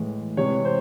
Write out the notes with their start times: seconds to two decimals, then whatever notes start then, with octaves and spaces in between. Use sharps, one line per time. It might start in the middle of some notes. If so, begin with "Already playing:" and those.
Already playing: A2 E3 G#3
0.37 C3 E3 G#3 C#5
0.65 C5